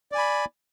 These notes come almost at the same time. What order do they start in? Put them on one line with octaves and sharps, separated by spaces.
D5 G#5 B5